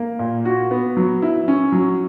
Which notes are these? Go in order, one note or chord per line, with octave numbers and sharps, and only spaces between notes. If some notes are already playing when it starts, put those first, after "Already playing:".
Already playing: A#3
A#2
F#4
B3
F#3
E4
C#4
F#3